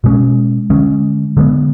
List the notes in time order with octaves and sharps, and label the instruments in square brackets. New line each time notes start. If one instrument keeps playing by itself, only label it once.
[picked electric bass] B2 G#3 C#4
D3 G#3 C#4
D3 G#3 B3